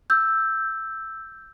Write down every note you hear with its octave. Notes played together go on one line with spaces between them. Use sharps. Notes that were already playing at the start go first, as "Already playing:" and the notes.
E6 G6